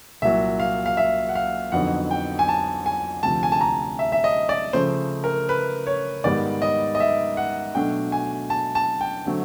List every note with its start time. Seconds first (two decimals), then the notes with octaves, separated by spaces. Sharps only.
0.22 C2 A#2 F#3 E5
0.60 F5
0.86 F5
0.97 E5
1.29 F#5
1.35 F5
1.72 F2 D3 F#3 B3 D#4 F#5
2.11 G5
2.39 G#5
2.49 A5
2.86 G#5
3.23 D2 C3 F3 A5
3.43 G#5
3.52 A5
3.61 A#5
3.99 E5
4.12 E5
4.24 D#5
4.49 D5
4.73 C#3 F3 A3 C5
5.24 A#4
5.49 B4
5.87 C#5
6.24 G#2 D#3 G3 B3 D5
6.62 D#5
6.95 D#5
7.00 E5
7.37 F#5
7.75 B2 F#3 A3 D4 G5
8.12 G#5
8.50 A5
8.75 A5
9.01 G5
9.26 D3 F#3 A3 C4